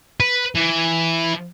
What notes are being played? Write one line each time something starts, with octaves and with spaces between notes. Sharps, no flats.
B4
E3